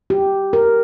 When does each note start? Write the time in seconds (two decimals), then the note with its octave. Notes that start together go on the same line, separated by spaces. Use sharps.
0.10 G4
0.53 A#4